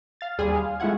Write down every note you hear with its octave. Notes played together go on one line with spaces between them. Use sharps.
F5 A6
D#2 G3 G#4 C6 D#6
F5
G#3 A3 E4 F4 F#5 G#6